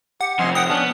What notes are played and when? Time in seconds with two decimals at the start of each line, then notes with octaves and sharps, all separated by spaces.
0.21 G4 F#5
0.39 F2 C3 D#5 G#5 C6
0.55 F#5 G5 D#6
0.69 B3 C#4 D4